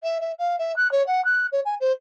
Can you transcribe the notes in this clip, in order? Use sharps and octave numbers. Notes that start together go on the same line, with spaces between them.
E5
E5
F5
E5
F#6
C#5
F#5
F#6
C#5
G#5
C5